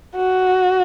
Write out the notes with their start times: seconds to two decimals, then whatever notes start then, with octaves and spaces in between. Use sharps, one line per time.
0.16 F#4